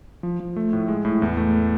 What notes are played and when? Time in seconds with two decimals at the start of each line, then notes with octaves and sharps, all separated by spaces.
0.23 F3
0.40 F3
0.56 A3
0.73 A2
0.88 G#3
1.05 A2
1.22 E2
1.37 A3